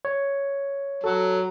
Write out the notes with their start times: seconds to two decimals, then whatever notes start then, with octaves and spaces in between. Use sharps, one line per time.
0.05 C#5
1.04 F#3 A4